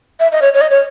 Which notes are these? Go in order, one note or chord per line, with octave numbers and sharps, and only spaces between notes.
E5
D#5
C#5
C#5
D#5
C#5